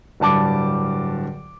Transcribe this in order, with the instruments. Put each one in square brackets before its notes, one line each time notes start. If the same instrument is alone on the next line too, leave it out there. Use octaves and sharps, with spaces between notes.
[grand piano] D1 G2 A5 D6